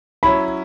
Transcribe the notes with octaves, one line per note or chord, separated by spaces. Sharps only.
F#3 C#4 E4 B5